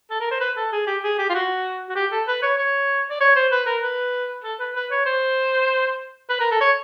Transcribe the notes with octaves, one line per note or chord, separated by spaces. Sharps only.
A4
A#4
C5
B4
A4
G#4
G4
G#4
G4
F4
F#4
F#4
G4
A4
B4
C#5
C#5
D5
C#5
C5
B4
A#4
B4
A4
B4
B4
C#5
C5
B4
A#4
A4
C#5